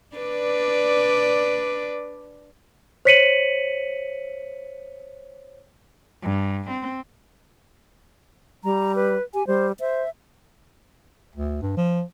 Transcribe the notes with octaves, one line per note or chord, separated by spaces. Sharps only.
D4 B4 D5
C5 C#5 B6 C#7 D#7 F#7
G2
C4
G3 A#5
B4
G4 G#5
G3 C5
C5 E5
D2
G2
F3